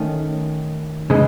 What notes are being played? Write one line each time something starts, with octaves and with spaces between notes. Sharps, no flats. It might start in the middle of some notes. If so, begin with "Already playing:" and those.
Already playing: D#3 A3 C#4
C#3 E3 G#3